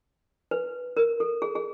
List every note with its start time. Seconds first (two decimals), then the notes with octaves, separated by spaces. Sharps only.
0.51 B4
0.97 A#4
1.20 A4
1.42 G#4
1.55 G#4